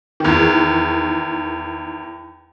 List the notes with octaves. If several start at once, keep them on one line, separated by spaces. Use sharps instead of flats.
E2 D#3